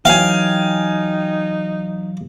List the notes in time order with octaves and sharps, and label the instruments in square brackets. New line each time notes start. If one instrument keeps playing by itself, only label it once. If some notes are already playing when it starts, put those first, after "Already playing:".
[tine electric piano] E3 F#3 [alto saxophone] D#4 [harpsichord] F5 [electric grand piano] G5 G#5